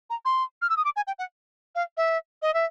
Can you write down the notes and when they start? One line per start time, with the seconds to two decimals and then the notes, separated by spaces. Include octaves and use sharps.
0.10 A#5
0.25 C6
0.62 F6
0.70 E6
0.77 D#6
0.85 D6
0.96 G#5
1.07 G5
1.19 F#5
1.75 F5
1.97 E5
2.42 D#5
2.54 E5